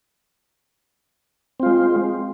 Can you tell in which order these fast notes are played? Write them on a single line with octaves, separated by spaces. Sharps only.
C4 F4 G#3